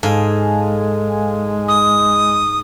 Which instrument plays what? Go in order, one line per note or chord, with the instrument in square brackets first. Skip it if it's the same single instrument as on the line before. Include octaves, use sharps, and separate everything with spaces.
[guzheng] G#2 [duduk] G#3 [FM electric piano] A4 F5 G#5
[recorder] D#6